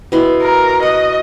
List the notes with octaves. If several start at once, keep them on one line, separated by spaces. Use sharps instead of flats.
B2 E4 C6
A#4
D#5 F#5